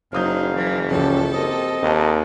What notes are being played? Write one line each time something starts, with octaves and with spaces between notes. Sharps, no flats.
F#1 F#3 D#4 C5 F5 D#6 G6
E3 F#3
C#2 F3 C#4 G4 A4
C4 G4 A#4 D#5
D#2 D#4 A5